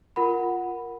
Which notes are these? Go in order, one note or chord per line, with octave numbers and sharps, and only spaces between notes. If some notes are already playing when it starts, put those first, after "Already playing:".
F4 A#4 F#5 B5